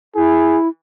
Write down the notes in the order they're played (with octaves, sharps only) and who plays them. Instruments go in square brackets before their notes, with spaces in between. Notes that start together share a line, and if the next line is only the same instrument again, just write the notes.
[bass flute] E4 [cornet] G#4